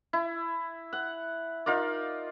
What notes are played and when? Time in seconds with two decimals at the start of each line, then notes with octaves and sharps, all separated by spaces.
0.13 E4
0.93 F#5
1.66 D#4 F4 A#4 D5